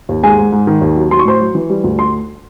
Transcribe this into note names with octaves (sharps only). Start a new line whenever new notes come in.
D#2
G#2 G#4 G#5
G#2
G#2
D#3
D#2
F#3
F#3 C6
C#6
A2 C5 C6
F#3
E3
G3
D2
C6